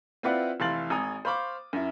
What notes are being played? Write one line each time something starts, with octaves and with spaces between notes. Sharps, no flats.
C4 E4 F4 B4 D5 F#5
F1 E3 F5 C6 A6 F#7
G#1 G#5 A#5 D#6
C5 F5 B5 C#6 D6
F#2 E4